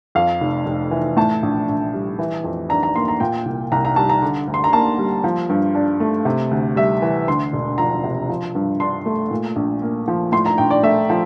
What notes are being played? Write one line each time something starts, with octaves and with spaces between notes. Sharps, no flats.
F2 F5
F1
F1
E3
A2 A5
A#1
A#1
G3
E3
F2
D4 A#5
A#5
A#3 C6
A#5
A#2 G5
C2
C2 A#5
A#5
G3 A5
A#5
D3
D2
C6
A#5
A#3 A5
G3
F3
G2
D4
A3
C3
D2
G3 E5
E3
D2 C6
E1
F3 A#5
C3
F3
G2
D4 C6
A3
A#2
A#1
A#3
F3
A2 C6
A#5
A#1 G5
D5
A3 E5
F3